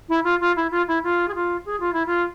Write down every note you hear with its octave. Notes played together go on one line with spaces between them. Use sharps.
E4
F4
F4
E4
F4
E4
F4
G#4
F4
G#4
F4
E4
F4